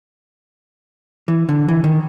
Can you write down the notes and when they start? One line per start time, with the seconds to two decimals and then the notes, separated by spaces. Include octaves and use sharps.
1.28 E3
1.49 D3
1.68 E3
1.84 D#3